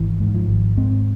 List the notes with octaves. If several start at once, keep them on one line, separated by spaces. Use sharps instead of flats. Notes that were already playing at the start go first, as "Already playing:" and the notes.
Already playing: G#1 E3
G#2
F3
G#1
G#2 C4